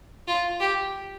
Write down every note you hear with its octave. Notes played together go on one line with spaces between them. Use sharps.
F4
G4